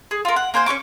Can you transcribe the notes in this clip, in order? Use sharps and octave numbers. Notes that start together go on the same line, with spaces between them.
G#4
F4 A#4
F#5
A#3 C5 G#5 G6
C#4 G4 C#6 D6